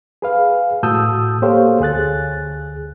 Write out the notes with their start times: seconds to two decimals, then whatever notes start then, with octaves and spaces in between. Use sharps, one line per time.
0.22 G#4 B4 F5
0.83 A2 F#4 A5 D#6 E6 G6
1.42 A#3 G4 A4 C5 C#5 F5
1.80 D2 G#4 F#6 A6